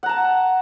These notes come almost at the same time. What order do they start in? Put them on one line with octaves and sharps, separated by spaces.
F#5 A#5 A5